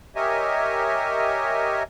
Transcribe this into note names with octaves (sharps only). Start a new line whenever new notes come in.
G4 A#4 C#5 D#5 E5 G#5